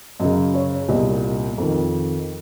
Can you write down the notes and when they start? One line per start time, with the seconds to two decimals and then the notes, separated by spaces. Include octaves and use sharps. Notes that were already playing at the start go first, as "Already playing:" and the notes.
0.20 F#2 C#3 D#5
0.54 C#5
0.88 C2 A#2 D#5
1.58 F2 D#3